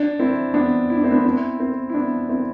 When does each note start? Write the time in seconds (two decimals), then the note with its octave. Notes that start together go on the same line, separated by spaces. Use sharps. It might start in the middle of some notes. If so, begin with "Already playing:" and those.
Already playing: D4
0.19 C4 E4
0.54 B3 D4
0.90 E4
0.97 D4
1.04 C4
1.11 B3 D4
1.24 C4 E4
1.60 C4 E4
1.90 E4
1.94 B3 D4
2.29 C4 E4